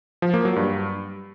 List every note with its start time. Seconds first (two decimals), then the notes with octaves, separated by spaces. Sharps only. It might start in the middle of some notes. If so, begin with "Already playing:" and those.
0.22 F3
0.34 A#3
0.45 F#3
0.56 G2